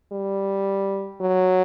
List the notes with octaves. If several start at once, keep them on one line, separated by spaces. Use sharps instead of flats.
G3
F#3